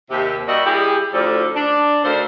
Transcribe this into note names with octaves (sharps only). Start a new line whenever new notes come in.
D#2 C3 G4
G3 A#3 D4 F#4 D#5 E5
G3 E4 G4 G#4
D2 A2 F3 A4 D5
D4
D2 D#3 D4 A4 C5 F5